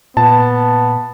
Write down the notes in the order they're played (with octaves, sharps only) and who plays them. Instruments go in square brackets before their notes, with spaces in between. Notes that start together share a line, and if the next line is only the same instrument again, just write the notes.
[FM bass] A#2 [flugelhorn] B3 [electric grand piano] A5